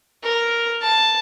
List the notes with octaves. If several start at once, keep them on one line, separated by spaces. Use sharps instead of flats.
A#4
A5